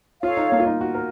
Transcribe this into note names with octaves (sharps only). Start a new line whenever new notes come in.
F4 A4 C#5 F5
D#4
A#3
F4
D#4
F#4
A#4